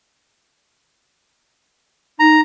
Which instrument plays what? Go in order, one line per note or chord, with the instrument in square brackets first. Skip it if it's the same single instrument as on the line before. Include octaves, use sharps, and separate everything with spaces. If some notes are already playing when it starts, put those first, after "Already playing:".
[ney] D#4 [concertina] A#5